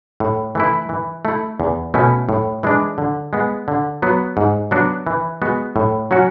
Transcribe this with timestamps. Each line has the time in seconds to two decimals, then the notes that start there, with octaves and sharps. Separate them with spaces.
0.20 A2
0.55 E3 A3 E4
0.89 E3
1.25 A3 E4
1.60 E2
1.94 B2 A3 C#4 E4
2.29 A2
2.63 E3 G#3 D4
2.98 D3
3.33 G#3 B3
3.68 D3
4.02 F#3 B3
4.37 G#2
4.71 F#3 B3 D4 F#4
5.07 E3
5.42 G#3 B3 F#4
5.76 A2
6.11 F#3 C#4 F#4